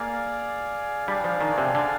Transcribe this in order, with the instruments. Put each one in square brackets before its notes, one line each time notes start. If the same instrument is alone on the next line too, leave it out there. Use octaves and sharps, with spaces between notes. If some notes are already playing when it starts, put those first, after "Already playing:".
Already playing: [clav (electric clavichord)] A#3 [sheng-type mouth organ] G#4 D5 F5
[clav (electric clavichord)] G3 [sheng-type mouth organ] D4 G#4 D5 F5
[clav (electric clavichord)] F3
D#3
C3
D3